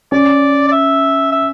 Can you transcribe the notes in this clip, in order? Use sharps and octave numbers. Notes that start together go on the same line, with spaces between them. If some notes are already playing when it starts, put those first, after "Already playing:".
C#4 D5
D5
E5
E5